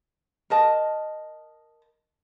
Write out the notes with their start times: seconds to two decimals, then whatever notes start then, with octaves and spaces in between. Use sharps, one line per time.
0.50 A#4 D#5 A5